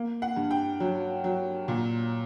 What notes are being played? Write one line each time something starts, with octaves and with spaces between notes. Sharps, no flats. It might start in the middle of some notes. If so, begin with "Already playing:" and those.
Already playing: A#3
F#5
G2
G5
F#3
F#3
A#2